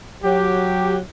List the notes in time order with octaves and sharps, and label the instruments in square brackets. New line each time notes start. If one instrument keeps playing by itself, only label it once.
[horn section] F#3 G4